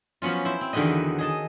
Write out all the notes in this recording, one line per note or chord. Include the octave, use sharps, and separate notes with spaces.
F3 F#3 B3 C#4 F4
E4 C5
C4
E2 D3 D#3 F#3 B4 D#5
G#4 D#5 A5